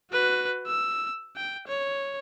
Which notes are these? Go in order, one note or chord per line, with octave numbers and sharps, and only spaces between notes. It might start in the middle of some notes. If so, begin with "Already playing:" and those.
F#4 B4
E6
G5
C#5